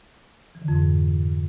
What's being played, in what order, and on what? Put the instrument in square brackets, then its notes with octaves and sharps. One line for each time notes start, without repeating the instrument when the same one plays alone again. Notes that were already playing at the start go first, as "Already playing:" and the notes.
[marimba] E3
D3
F2
G#2